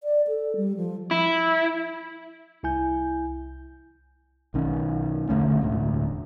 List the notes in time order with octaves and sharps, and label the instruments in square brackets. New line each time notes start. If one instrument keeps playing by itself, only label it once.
[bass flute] D5
A4
G3
F3
[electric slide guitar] E4
[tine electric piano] C2 E4 G#5 G6
[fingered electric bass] B1 D#3 C#4
E2 D3 A3 C#4
E1 A1 D2 A2